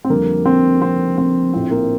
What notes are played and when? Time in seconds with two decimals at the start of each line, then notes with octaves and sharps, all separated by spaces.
0.04 C4
0.09 F2 D3 G3 A#3
0.46 C4
0.82 C4
1.18 C4
1.53 A#1 A2 F3 A3 C4
1.71 A#3